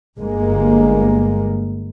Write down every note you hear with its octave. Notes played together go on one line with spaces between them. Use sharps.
G1 G#3 A#3